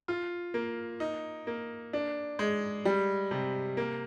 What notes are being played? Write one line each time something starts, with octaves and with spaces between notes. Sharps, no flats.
F4
A#3
D#4
A#3
D4
G#3
G3
C3
A#3